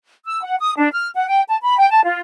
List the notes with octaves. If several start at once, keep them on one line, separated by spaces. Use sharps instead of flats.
E6
F#5
D#6
D4
F6
F#5
G5
A5
B5
G5
A5
F4